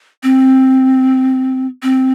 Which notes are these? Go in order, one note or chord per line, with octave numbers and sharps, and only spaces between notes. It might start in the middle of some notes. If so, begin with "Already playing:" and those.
C4
C4